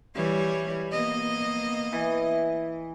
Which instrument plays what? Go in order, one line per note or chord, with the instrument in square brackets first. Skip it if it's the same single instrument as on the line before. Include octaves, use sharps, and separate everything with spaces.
[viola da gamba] E3 G3 C#5
A#3 B3 D#5
[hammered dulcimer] E3